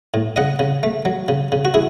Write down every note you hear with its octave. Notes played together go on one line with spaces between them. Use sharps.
A2
C#3 D#5 F#5
C#3
A3
F#3
C#3
C#3
F#4
E4 G#4